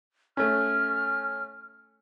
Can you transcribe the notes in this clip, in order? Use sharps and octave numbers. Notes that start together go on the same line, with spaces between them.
A3 C#4 F6